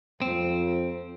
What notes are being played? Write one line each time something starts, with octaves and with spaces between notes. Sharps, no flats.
F2 C4